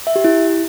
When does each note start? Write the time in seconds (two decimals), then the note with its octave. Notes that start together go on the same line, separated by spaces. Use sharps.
0.07 E5
0.16 G4
0.24 E4